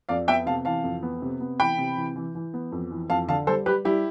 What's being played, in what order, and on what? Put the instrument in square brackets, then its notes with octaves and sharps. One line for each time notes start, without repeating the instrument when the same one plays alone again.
[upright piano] F2 D5 F5
B3 E5 G5
C3 F5 A5
E3 F5 A5
F2
B3
C3
B3
E3 G5 B5
C3
E3
E3
E3
B3
F2
E3
F2 F5 A5
D3 F5 A5
G3 A4 C5
G3 G4 B4
G3 E4 G4